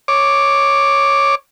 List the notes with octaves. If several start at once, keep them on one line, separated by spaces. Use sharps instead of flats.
C#5 D6